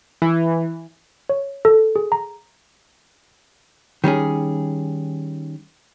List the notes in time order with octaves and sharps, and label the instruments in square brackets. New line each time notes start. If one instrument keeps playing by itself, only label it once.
[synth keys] E3
[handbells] C#5
A4
G#4
A#5
[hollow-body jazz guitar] D#3 G3 C#4 G#4